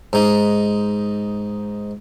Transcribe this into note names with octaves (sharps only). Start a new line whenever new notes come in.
G#2 D#4